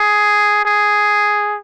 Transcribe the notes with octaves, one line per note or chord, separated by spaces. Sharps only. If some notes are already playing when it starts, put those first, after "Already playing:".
Already playing: G#4
G#4